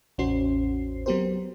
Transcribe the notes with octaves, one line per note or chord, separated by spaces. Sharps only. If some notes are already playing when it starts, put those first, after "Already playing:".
A1 E2 C#4 F#4 C5 C7
F#3 B3 C4 G4 A#4 C5